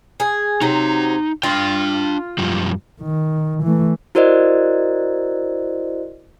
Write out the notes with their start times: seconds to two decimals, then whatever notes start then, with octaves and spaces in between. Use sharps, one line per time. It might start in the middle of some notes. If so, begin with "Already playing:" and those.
0.20 G#4
0.61 C3 F#3 C4 D#4
1.43 D4 F4 G5
2.38 F#2 F3 G3
3.01 D#3
3.63 E3 A3
4.15 E4 F#4 A#4 C5 D5 D#5